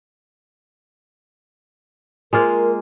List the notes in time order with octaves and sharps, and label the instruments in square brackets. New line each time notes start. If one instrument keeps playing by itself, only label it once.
[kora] G#3 A#3 F4 [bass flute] A#4